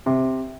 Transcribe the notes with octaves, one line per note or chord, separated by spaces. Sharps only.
C3